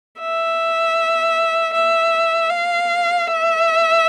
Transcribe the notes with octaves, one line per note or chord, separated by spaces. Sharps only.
E5
E5
F5
E5